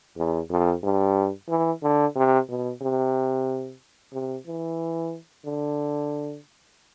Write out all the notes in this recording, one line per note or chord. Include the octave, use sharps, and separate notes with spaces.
E2
F2
G2
E3
D3
C3
B2
C3
C3
E3
D3